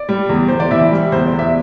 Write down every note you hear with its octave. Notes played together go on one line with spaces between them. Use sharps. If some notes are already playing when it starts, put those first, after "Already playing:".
Already playing: D5
G3
E2
E2 C5
D5
E3 E4 E5
G3
E2 C5
D5
E2
E5